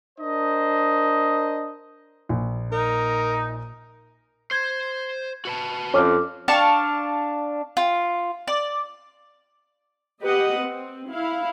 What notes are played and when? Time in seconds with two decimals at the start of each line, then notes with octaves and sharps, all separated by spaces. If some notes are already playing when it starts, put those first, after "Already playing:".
0.19 D4 A#4 C5 D#5
2.29 A#1
2.72 D#4 A#4
4.51 C5 G6 G#6
5.45 F#4 B4 A5
5.94 F2 C#4 A4 D6 F6
6.48 D4 F5 A5 C#6
7.77 F4
8.48 D5
10.22 G4 B4 D#5 F#5
10.57 C4
11.13 E4 F5